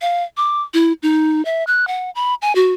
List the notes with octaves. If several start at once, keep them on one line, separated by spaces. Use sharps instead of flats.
F5
D6
E4
D#4
E5
F#6
F#5
B5
G#5
F#4